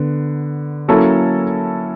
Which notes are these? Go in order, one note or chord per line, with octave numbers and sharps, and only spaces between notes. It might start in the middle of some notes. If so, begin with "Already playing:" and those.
Already playing: D3 B3
F#3 A#3 C#4 E4 A4